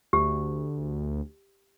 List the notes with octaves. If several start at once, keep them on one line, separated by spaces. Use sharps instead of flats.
D2 G4